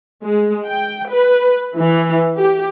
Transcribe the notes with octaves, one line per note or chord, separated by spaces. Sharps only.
G#3
G5
B4
E3
G4